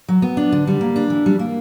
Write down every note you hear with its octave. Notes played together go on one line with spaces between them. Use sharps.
F#3
B3
D4
D3
G3
A#3
D4
E3
G3
A#3